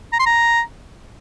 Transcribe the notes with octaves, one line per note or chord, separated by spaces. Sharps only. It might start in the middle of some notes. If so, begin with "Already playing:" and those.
A#5
C6
A#5